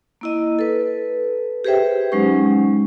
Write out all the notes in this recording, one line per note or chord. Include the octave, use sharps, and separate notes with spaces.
A#3 E4 D#5
A4 B4
G4 G#4 B4 C5 E5 G5
F#3 G#3 C#4 D#4 C#6